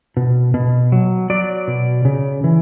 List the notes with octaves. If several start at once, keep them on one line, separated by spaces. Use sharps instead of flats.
B2
B2
F#3
F#3 D5
B2
C#3
E3